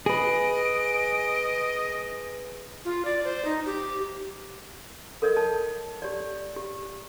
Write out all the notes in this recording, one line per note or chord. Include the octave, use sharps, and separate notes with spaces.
G#4 B4 D#5 D7
F4
D5
C5
D#4
G4
A4 A#4 C#5 D#5
D#5 A5
G4 C#5 D5
G4